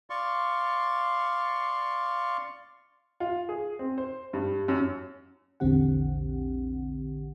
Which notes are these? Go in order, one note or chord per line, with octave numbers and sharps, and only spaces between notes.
D5 F5 C6 C#6
F4
G#4
C4
C5
G2
F#2
A#1 E2 D3 C4 G4 F#5